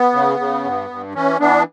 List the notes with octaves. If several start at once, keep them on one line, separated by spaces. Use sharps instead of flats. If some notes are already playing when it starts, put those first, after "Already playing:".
Already playing: B3
C#3
C#3
G2
G2
E3 C#4
E3 B3 D4